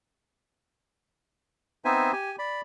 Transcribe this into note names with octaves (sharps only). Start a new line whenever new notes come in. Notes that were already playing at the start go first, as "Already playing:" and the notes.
B3 C4 D#4 C5 E5 G#5
G4 G#5
D5 B5